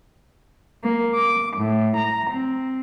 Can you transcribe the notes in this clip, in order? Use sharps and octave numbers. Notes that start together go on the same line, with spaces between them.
A#3
D6
A2
A#5
C4